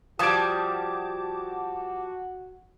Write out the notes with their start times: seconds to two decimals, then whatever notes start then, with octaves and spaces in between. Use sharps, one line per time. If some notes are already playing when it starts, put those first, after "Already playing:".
0.19 F3 G3 F#4 A5 D6 D#6 G#6 D7